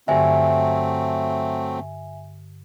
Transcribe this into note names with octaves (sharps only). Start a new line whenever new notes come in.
G2 D3 F#3 A3 C4 E5 G#5